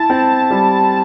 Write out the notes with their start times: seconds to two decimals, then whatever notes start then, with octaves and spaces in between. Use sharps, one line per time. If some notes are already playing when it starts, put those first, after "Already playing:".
Already playing: E4 A5
0.10 C4
0.50 G3